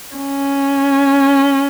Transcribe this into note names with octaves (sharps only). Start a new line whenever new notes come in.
C#4